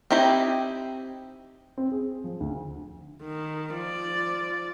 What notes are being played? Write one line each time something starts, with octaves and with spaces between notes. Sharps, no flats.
C4 D#4 E4 G4 D#5
C4
G#4
F3
D2
D#3
F3 D5